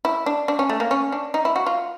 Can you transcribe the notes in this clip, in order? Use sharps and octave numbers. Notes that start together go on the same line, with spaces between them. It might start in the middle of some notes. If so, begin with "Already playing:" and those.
E4
D4
D4
C#4
A3
A#3
C#4
D4
D#4
E4
F#4
F4